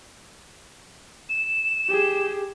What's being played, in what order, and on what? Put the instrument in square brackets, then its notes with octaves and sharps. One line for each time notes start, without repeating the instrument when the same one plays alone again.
[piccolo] E7
[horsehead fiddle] G4 G#4